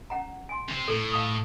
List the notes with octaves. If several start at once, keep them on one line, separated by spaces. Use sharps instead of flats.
C#4 F#5 A#5
G#5 C6
C3 C5
A2 A4
F5 A5 D#6